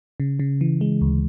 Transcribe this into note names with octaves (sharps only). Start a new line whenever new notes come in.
C#3
C#3
E3
G#3
D2